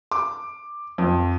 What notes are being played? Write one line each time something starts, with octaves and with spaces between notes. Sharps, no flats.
D6
F2